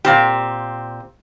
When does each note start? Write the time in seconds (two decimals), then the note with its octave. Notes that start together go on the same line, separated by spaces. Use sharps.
0.05 A#2 C4 G4